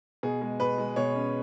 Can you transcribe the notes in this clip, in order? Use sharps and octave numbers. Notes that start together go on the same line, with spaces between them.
B2 G#4
G#3
B2 B4
G#3
B2 C#5
C#4